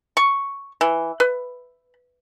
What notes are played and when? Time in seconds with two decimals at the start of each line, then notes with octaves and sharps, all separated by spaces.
0.17 C#6
0.81 E3
1.20 B4